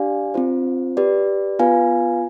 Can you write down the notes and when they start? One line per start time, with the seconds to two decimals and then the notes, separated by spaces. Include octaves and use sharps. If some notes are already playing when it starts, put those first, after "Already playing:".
Already playing: D4 G4 D5 F5 G#5
0.34 C4 F4 C5
0.97 G4 B4 D5
1.59 B3 F4 B4 F5 G#5